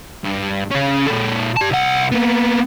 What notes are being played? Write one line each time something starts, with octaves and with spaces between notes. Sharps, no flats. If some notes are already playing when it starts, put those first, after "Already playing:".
G2
C#3 C#4
A#2 A4
G4 A5
C2 F#5
A#3 B3